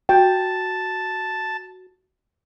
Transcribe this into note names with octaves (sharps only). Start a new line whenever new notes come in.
F#4 G5 A5